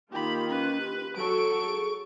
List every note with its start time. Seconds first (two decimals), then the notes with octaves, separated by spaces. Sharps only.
0.11 D#3 A#3 F4 G4 B5
0.48 C#4 B4
0.80 G4
1.16 F#3 F#4 A4 C#6 D7
1.65 G#4